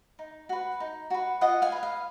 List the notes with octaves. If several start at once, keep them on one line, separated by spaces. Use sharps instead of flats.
D#4
F#4 B4
D#4
F#4 B4
F4 D#5 F#5
F5 G#5
B4 D#5
F5